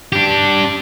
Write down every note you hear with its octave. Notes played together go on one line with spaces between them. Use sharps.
D4 G4